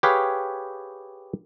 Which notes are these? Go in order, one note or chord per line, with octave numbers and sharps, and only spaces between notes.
G4 G#4 B4 C#5 F5 G5